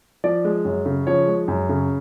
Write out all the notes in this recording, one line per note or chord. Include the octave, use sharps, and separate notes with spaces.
F3 D5
G#3
F#2
C#3
F3 C#5
G#3
F#2
C#3